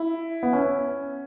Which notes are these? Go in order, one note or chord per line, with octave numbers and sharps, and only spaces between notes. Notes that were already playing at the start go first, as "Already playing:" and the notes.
Already playing: E4
B3
C#4